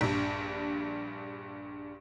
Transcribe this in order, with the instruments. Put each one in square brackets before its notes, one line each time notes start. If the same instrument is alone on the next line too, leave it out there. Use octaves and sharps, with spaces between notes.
[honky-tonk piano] A#1 G2